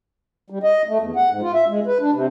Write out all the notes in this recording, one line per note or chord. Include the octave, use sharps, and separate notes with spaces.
G3
D#5
A3
E2
F#5
G#2
F4
E5
G#3
B4
D4
C3